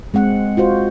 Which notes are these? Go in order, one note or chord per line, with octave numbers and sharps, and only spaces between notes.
G#3 C4 F#5
F4 F#4 C5